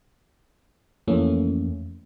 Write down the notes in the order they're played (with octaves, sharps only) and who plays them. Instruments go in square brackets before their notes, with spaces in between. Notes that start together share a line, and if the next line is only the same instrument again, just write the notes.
[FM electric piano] F2 E3 A3 A#3 C#4